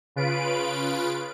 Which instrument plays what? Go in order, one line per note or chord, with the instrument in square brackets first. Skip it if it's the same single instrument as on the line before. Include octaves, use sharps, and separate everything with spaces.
[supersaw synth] C#3 F4 B4 D7